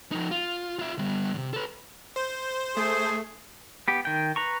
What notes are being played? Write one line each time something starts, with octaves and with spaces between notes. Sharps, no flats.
F3 D#4
F4
F4 E5
G3 B3
E2 C3
A4 B4
C5
A3 G#4
B3 G4
D#3 G5
B4 A#5 C#6